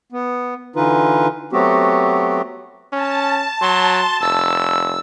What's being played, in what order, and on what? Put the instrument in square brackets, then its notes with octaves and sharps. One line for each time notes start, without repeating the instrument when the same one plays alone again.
[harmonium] B3
D3 E3 D#4 F4 B4
F#3 A3 B3 C4 F#4 G4
[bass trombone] C#4 [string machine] A5
[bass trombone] F#3 [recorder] C6
[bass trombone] F1 [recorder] E6